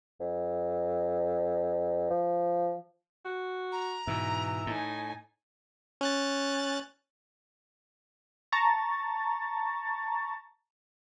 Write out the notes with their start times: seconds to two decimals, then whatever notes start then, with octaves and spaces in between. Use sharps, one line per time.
0.20 F2
2.11 F3
3.25 F#4
3.72 A#5
4.07 G#2 B2 E3
4.67 A2 D#4 G#5
6.01 C#4 F#6 A6
8.52 A5 A#5 C#6 A6